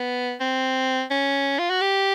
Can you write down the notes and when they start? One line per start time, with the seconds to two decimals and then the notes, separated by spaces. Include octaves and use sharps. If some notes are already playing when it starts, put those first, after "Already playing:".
Already playing: B3
0.40 C4
1.11 C#4
1.59 F4
1.70 F#4
1.81 G4